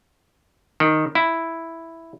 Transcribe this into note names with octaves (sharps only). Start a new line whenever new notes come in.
D#3
E4